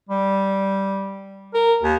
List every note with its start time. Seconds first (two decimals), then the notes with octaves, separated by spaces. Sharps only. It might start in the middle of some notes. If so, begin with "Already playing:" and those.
0.09 G3
1.54 A#4
1.83 D#2